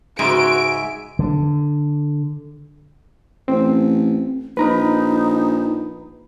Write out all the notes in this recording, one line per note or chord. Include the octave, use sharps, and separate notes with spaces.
G#2 C#3 G#3 F#4 E5 G#5 D7
D3
A1 C4
A#1 D#4 B4 A#5 B5